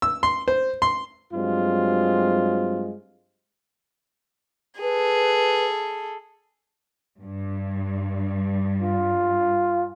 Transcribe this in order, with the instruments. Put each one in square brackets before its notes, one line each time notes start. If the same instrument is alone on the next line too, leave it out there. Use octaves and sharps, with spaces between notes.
[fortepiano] E6
C6
C5
C6
[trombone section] G2 F#3 G#3 C4 F4
[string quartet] G#4 A4 [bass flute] B4
[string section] G2
[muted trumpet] F4